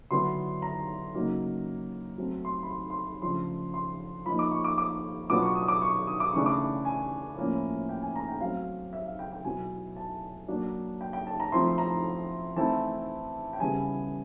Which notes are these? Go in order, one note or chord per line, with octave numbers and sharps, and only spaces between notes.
D3 F#3 B3 E4 C6
A#5
C#3 F#3 A#3 D#4
F#3 A3 C4
C6
B5
C6
C6
B5
C#3 F3 A3 D4 C6
C6
F3 A#3 D#4 B5
D6
C#6
D6
D6
B2 F#3 B3 D4 F4 D6
C#6
D#6
D6
C#6
D#6
D6
C#3 E3 A3 D4 C#6
D6
G#5
A2 F3 A#3 C#4 E4
G5
G#5
A#5
G5
F#3 A3 C4 F5
E5
F5
G5
G5
B2 F#3 B3 E4 G#5
A5
F#3 A#3 D4
G5
G5
A5
A#5
F3 A3 C4 E4 C6
A#5
E3 A3 C4 E4 A5
G5
C#3 E3 G3 B3 G#5